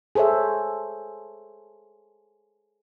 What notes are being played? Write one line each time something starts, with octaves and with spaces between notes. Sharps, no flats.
G#4 A4 C5 C#5 E5